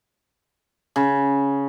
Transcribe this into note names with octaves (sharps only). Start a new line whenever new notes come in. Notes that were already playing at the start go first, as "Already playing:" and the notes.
C#3